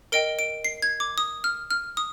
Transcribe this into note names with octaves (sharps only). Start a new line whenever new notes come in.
A#4 D#5 G5 D7
D7
C7
G#6
D6
D#6
F6
F6
D#6